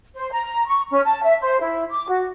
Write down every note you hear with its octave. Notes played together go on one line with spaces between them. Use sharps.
C5
A#5
C#6
C#4
A5
E5
C5
E4
D6
F#4